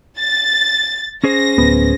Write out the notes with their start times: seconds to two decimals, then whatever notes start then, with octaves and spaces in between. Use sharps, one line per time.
0.19 A6
1.24 C#4 G#4 C5 A#6
1.58 D1 B3